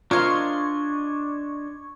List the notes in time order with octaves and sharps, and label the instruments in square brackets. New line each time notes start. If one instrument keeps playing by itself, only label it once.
[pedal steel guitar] D4 D#5 C6 [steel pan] F4 [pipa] A#4 F5 [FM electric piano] C#6 G#6